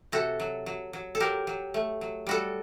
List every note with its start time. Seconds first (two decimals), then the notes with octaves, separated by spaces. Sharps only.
0.12 C3 F#4 A4
0.40 F#3
0.66 F#3
0.93 F#3
1.15 A4
1.20 F#3 G4 A#4
1.47 F#3
1.74 A3
2.01 F#3
2.27 G3 F#4 A4